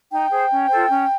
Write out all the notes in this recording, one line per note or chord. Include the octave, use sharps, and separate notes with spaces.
D#4 G5
G#4 C5
C#4
F4 A4 C5
C#4